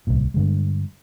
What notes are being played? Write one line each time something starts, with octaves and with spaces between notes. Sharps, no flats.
D1 C2 A#2
G2 D3 G#3